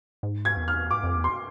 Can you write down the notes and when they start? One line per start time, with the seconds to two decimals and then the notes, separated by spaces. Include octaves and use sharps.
0.23 G#2
0.45 G#6
0.57 E2
0.68 F6
0.91 G#2 D6
1.04 F2
1.16 E2
1.24 C6